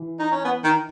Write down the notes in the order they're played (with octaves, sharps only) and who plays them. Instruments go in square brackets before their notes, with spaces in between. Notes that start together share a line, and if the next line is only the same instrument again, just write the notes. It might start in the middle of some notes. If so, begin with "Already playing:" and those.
Already playing: [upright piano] E3
[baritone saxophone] D#4
C#4
B3
D#3